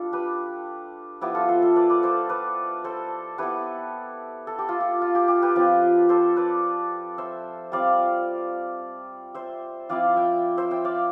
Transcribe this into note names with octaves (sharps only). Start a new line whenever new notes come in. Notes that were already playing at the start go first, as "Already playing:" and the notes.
Already playing: G3 D4 F4 A4
G4 B4
F3 B3 E4 G4
F4 A4
A4 C5
A4 C5
B4 D5
B4 D5
A4 C5
B4 D5
A4 C5
B3 E4 G4 B4
A4
G4
F4
G4
F4
G4
G4
G4 B4
F3 C4 F4
A4 C5
B4 D5
C5 E5
G3 C4 F4 D5 F5
C5 E5
F3 C4 E4 D5 F5
E5 G5
C5 E5
E5 G5
D5 F5